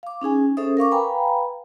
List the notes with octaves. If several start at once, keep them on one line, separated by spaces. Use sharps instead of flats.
F5 D6
C#4 D#4 G#4 G#5
C#4 G#4 A4 C5 E5 D#6
A#4 F5 C#6 D6
B4 F5 G5 G#5 A#5 B5